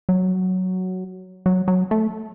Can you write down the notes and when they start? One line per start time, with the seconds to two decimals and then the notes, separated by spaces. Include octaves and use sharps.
0.09 F#3
1.46 F#3
1.68 F#3
1.91 A3